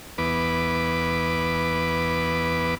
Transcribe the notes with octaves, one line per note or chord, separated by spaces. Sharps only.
E2 B3 B4 D6